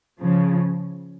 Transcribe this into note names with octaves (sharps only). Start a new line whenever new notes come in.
C#3 F3